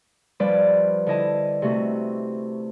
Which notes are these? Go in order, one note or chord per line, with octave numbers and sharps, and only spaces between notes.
F3 G3 C#4 B4 D5
D3 E4 D#5 A5
C3 A3 F#4